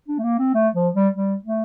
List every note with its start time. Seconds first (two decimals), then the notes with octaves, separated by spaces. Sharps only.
0.08 D4
0.18 A3
0.23 A#3
0.39 C4
0.54 A3
0.74 F3
0.94 G3
1.14 G3
1.44 A3